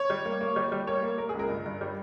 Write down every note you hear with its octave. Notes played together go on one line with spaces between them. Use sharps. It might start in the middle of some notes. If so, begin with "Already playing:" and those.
Already playing: C#5
G3
A#3
A#3
G3
G3
A#3 C#5
A#3
A#3 A#4
G#4
C#2
A#4
G2
G2
G3